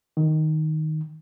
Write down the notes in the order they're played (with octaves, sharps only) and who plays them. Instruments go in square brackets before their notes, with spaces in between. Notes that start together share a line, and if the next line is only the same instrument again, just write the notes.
[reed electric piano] D#3